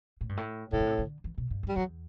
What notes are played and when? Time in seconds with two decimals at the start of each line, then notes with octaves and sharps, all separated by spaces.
0.21 A2
0.29 G2
0.37 A2
0.72 A2 C3
0.80 D3
0.87 C3
0.99 D3
1.24 E3
1.38 B2
1.50 G2
1.63 F#2
1.68 G3
1.76 E2 F#3